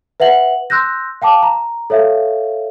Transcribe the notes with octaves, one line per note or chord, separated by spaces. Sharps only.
B4 E5 F#5 F#7
C6 E6 F#6 G6 A#6
F5 G5 A5 D6
A#5
A4 C#5 E5 F5